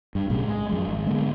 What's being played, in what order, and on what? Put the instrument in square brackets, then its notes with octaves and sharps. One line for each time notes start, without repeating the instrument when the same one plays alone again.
[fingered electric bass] G2
B1 A2 C#3 G3
G#3
F#2 F3 G#3
G#1
D3 G#3 A#3 B3